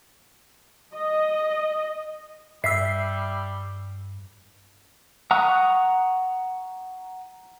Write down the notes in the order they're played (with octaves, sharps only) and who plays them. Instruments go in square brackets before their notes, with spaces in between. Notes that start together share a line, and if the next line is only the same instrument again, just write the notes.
[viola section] D#5
[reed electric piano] G2 [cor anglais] G3 [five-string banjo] E5 [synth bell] E6 B6 C7
[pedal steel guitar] F#5 A#5 C#6 D#6 F#6